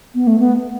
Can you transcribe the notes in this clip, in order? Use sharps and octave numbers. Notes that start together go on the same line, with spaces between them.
B3
A3
B3